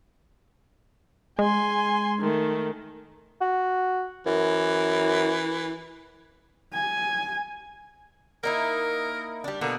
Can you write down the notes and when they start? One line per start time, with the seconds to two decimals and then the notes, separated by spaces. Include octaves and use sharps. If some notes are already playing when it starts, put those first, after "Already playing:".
1.39 G#3 G#5 C6
2.20 D#3 A3
3.41 F#4
4.26 F#2 E3
6.73 G#5
8.43 A#3 D#4 E4 A#4
9.44 G3 D4
9.61 B2 D3 A#3 B3